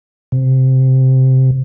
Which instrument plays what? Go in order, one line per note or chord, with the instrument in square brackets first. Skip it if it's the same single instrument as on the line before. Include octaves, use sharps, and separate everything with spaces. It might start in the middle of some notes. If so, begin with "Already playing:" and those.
[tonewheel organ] C3